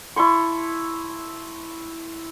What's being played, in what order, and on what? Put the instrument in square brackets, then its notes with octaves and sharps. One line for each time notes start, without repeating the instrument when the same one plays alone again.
[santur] E4 A5 C6 C#6